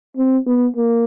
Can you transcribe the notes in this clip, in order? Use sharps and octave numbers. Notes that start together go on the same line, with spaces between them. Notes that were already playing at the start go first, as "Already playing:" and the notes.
C4
B3
A#3